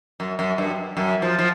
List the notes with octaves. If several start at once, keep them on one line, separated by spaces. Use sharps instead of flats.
F#2
F#2
G2
F#2
F3
F3